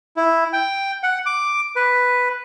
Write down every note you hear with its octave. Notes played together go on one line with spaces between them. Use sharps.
E4
G5
F#5
D6
B4